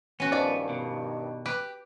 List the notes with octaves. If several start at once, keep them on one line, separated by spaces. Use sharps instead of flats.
B3 C#4 F#4
G2 D#3 F3 D5
B2
G4 B4